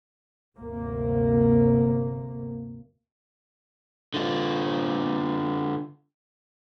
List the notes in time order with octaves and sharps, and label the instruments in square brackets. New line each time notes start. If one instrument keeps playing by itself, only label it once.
[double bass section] G1 D2 C3 A#3
[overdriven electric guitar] D3 F4